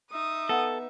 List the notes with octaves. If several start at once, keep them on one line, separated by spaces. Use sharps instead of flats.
D#4 E5 D#6
B3 A4 F#5